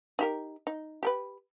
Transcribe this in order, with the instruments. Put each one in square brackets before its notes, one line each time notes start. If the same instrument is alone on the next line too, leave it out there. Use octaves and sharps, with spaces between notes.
[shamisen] D#4 G4 A#4
D#4
G4 A#4 B4